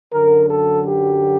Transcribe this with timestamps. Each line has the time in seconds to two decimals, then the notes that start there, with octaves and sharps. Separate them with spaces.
0.13 F#2 D3 F#3 A#4
0.49 A4
0.85 G4